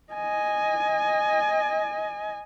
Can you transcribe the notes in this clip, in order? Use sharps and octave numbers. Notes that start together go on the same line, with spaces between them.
D#5 G#5